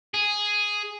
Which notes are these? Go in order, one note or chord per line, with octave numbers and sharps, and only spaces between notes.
G#4